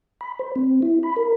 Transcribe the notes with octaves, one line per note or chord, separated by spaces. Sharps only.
B5
C5
C4
E4
B5
A#4